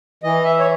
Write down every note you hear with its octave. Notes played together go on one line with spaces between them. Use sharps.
E3 D#5
E5
C#5